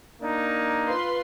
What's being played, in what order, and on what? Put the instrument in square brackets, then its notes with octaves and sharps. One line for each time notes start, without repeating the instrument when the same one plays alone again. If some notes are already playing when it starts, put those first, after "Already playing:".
[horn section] A#3 D4 D#4
[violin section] F4 B4 C6